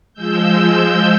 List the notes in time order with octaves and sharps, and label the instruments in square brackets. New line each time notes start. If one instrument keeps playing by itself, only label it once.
[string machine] F3 G#3 E6 G6